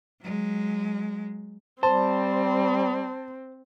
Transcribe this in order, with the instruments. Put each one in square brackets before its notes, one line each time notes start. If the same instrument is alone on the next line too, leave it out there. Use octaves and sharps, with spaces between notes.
[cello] F#3 G#3
[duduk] G3 [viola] C4 [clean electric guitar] C5 [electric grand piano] A5